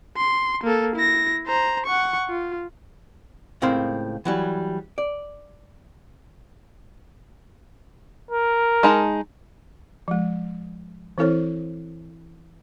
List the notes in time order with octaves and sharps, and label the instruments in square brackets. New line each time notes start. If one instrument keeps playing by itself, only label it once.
[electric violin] C6
A#3 A4
E4 A#6
C5 A#5
F#5 C#6
F4
[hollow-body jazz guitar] C#2 A2 C4 A#4 F5 C6
E3 F#3 G3
D5
[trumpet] A#4
[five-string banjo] G#3 D#4 A5
[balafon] F3 G#3
E3 C4 E4 A4 C5 C#5